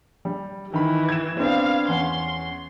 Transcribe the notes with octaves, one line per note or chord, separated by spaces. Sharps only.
G3
D#3 E3 B5
G#6 E7
B3 C4 D4 F5
E2 C#4 F#5 C6